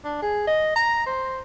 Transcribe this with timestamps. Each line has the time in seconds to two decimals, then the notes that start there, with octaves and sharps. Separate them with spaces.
0.05 D4
0.22 G#4
0.47 D#5
0.76 A#5
1.06 C5